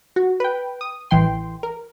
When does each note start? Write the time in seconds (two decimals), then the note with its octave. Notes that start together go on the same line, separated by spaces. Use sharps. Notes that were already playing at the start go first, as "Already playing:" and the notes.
0.16 F#4
0.40 B4 G5
0.81 D#6
1.11 A1 E3 G5 C6
1.63 A#4